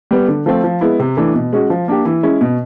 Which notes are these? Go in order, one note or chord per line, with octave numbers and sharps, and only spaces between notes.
G3 B3
D3
F3 A3 C4
F3
G#3 B3 E4
C3
E3 A3 D4
B2
G#3 C#4 F#4
F3
A#3 D4 G4
E3
G#3 C#4 E4
B2